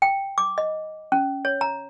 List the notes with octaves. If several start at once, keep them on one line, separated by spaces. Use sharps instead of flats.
G5
D6
D#5
C#4
C#5
A#5